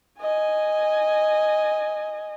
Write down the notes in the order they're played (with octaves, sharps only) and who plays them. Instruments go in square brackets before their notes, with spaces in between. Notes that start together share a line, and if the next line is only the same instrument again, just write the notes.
[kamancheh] D#5 G#5